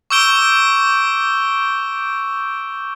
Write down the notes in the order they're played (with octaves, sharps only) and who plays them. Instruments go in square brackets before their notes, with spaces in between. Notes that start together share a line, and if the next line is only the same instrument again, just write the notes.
[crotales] C#6 D6 E6 G6 D7 G7